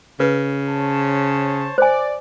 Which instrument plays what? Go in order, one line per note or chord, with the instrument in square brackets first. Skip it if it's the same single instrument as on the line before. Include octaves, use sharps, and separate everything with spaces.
[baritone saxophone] C#3 [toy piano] B4
[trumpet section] C5 C#5 A5
[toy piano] C5 G#5 [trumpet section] D5